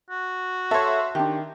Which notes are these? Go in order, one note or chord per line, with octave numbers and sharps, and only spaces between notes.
F#4
A4 C#5 E5 C6
D#3 D4 G4